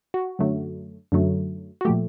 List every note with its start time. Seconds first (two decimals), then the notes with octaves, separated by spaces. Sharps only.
0.14 F#4
0.39 F#2 D3 F#3 A3
1.12 F#2 D3 F#3 A3
1.81 F#4
1.85 A#2 F3 A3 G4